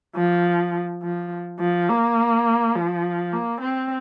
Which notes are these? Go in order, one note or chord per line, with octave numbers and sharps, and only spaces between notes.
F3
F3
F3
A#3
F3
A#3
C4